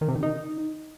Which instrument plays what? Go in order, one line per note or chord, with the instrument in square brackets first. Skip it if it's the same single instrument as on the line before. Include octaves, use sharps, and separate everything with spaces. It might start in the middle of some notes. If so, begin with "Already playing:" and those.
[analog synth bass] D#3
C3
D#3
D#4